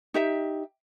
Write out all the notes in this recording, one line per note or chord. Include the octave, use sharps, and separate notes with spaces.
D#4 G4 E5